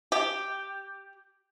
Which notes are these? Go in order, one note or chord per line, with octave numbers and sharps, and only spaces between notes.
G4